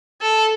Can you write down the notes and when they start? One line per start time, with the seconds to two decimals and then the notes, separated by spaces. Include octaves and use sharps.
0.21 A4